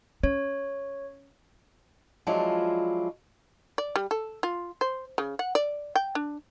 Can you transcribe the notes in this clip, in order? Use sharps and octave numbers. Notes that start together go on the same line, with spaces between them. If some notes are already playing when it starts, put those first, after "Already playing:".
C#4 C#5
F3 F#3 G#3 D4 E4 F4
D5
G3
A4
F4
C5
C#3
F#5
D5
G5
D4